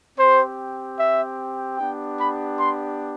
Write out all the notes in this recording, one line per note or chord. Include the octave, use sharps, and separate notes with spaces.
C4 G4 C5
E5
B3 D4 G4 G5
B5
C6